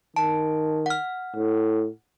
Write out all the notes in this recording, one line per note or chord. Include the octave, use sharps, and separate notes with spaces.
D#3 A5
F#5 F6
A2